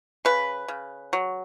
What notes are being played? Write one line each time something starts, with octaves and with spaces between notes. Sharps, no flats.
C#3 B4
C#3
F#3